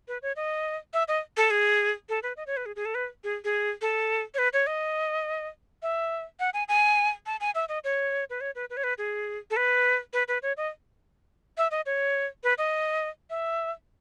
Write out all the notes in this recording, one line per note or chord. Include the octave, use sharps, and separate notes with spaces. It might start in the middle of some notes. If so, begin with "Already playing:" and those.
B4
C#5
D#5
E5
D#5
A4
G#4
A4
B4
D#5
C#5
B4
G#4
G#4
A4
B4
G#4
G#4
A4
C#5
B4
C#5
D#5
E5
F#5
G#5
G#5
A5
G#5
E5
D#5
C#5
B4
C#5
B4
B4
C#5
B4
G#4
A4
B4
B4
B4
C#5
D#5
E5
D#5
C#5
B4
D#5
E5